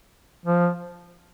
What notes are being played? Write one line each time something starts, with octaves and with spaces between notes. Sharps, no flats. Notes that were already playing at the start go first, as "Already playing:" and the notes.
F3